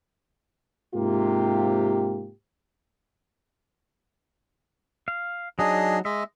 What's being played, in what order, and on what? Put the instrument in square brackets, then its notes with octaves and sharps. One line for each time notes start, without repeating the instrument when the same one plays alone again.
[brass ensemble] G#2 C3 A#3 F4 G4
[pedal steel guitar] F5
[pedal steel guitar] F#3 D#4 [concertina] D4 G#4 D#5
[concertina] G#3 D#5 [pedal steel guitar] E5